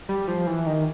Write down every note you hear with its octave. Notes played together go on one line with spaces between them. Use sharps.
G3
F3
E3
D#3